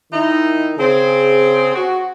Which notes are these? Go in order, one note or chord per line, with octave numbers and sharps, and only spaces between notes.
D#3 D#4 E4
C#3 C4 G#4
F#4